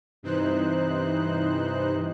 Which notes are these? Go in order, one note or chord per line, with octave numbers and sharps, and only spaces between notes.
G2 C3 E3 D#4 C5 F#6